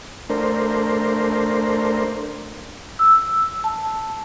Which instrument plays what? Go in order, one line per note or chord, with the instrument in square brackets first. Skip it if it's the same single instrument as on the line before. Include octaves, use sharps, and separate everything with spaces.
[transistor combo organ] A3 D4 A#4 C5
[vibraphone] E6
A5